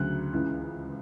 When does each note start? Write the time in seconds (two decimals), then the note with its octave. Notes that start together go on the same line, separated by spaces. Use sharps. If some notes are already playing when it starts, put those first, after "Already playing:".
Already playing: D2 C#3 F#3 F#6
0.33 C#2 C#3 E3